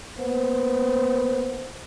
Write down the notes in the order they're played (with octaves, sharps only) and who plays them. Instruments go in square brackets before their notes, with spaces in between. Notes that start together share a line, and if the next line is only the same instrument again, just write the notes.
[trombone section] A#3 B3 C5